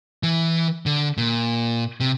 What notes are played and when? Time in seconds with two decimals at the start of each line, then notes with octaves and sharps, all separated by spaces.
0.23 E3
0.86 D3
1.18 A#2
2.00 C3